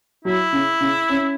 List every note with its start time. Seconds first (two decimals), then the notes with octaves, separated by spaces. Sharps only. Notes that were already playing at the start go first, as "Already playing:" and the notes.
0.25 F#3 E4
0.53 C#3
0.80 C#3
1.09 C#4